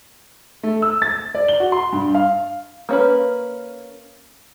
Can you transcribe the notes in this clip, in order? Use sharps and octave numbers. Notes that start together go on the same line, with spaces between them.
A3
E6
A6
D5
G7
F#4
C6
G2
F5
A#3 C#4 B4